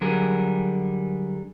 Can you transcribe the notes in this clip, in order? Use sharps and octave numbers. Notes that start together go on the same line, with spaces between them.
D3 F#3 G3 G#4 A#4